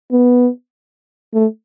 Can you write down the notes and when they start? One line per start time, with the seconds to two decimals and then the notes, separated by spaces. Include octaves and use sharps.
0.12 B3
1.34 A3